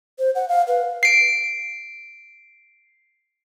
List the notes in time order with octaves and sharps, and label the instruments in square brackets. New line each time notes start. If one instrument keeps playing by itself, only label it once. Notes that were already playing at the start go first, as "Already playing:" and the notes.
[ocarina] C5
F#5
F5
B4
[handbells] C7 D7